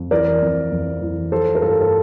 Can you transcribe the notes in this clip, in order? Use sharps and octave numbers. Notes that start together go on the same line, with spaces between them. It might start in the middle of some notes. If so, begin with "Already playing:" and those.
Already playing: F2
E3 A#4 D5
F2
F2
E3
F3 A4 C5
A#4
G2 F4 A4
A4